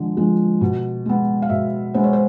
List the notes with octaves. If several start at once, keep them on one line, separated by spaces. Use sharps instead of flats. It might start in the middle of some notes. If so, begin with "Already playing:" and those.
Already playing: D3 F3 G#3
F3 G#3
B2
G#3 B3
F5
B2 E5
G#3 B3 C5
C#5
C5